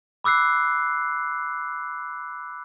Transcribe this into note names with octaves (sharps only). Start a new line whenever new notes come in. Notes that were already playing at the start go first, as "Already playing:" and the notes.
B5 D6 E6 F#6 C7